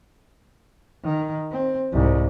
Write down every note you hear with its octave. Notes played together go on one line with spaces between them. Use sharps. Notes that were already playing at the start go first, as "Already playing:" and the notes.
D#3
C4
C2 G#2